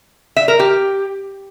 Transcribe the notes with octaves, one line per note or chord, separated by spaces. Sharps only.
E5
A#4
G4